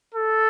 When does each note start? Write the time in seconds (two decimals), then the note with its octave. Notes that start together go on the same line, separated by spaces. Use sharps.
0.15 A4